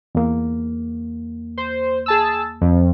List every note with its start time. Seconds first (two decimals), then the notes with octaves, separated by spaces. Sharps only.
0.15 E2 A#3
1.57 C5
2.06 G#4 A5 E6
2.61 F2